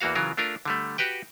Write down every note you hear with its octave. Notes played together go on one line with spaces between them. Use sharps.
E2 E3 A#3 F#4 F5
C#3 E3 F#3 F4 A#4
A3 D4 F4 A#4
D3 G3 A3
F#4 G4 B4 G5